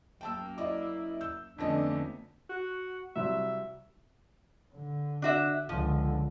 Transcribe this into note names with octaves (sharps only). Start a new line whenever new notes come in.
F#2 A#3 G5 A5 E6
E4 D5 D#5 D6
E6 G6
F2 D3 A3 B3 C#4 D4 D#5
F#4
C2 F#3 E5
D3
D4 F#4 E5
C#2 D3 F3